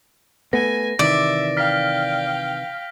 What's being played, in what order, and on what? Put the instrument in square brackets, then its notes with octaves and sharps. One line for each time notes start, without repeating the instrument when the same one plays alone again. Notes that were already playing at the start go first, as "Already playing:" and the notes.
[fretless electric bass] A3 B3 [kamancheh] G#5 [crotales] A#6
[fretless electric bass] C3 D#3 E3 [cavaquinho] D5 [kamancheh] E5
[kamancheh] F5 G5 [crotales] F6 B6